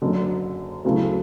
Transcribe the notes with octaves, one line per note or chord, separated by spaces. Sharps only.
F#1 F#2 D3
D2 C#3 F#3 A3 E4